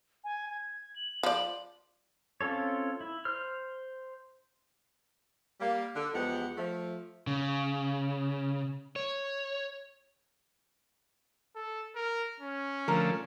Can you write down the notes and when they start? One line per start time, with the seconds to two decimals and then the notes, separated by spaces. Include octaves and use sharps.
0.24 G#5
0.49 G#6
0.96 F#7
1.23 F3 D5 F#7
2.41 C4 C#4 F4 A4 C#5
3.01 E4
3.25 C5 F6
5.61 G3 A#3
5.95 D3
6.13 E2 F3 G#3 B3 G4 F#5
6.57 F3 A3
7.27 C#3
8.96 C#5
11.55 A4
11.96 A#4
12.40 C#4
12.88 D3 F3 A3 A#4